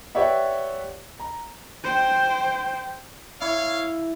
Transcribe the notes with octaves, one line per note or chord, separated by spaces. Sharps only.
G4 B4 C#5 D5 E5 F#5
A#5
C5 G5
E4 C#5 F5